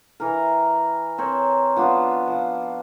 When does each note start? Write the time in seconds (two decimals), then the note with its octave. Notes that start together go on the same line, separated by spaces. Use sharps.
0.20 E3 A#4
1.18 C4 A#4 C#5
1.76 F3 B3 D4 F4
2.28 F3